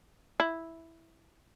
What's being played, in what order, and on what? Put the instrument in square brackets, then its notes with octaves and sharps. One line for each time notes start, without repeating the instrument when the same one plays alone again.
[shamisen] E4